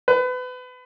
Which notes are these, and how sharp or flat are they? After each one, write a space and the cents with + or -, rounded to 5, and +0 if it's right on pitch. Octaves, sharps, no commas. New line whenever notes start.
B4 +30